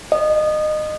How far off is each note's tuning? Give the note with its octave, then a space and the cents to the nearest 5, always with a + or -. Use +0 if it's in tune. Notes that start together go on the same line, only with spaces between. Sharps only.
D#5 -25